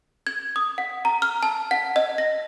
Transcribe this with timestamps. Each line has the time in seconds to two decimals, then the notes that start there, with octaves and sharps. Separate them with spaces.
0.27 G#6
0.56 D#6
0.78 F#5
1.05 A#5
1.22 F6
1.43 A5
1.71 F#5
1.96 D#5
2.18 A#6